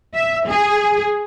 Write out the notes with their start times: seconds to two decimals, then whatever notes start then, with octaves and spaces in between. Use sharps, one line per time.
0.15 E5
0.49 G#4